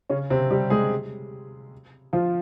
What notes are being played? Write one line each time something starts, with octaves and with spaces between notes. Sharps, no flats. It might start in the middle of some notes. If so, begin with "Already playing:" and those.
C#3 C#4
C3 C4
G3 G4
G#3 G#4
F3 F4